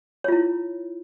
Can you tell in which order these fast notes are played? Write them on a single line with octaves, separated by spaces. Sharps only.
C#5 F4 E4